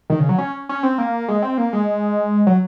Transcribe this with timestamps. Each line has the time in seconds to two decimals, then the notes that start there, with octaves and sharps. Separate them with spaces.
0.10 D#3
0.19 C#3
0.29 F#3
0.38 C#4
0.69 C#4
0.83 C4
0.98 A#3
1.28 G#3
1.42 C4
1.58 A#3
1.73 G#3
2.47 F#3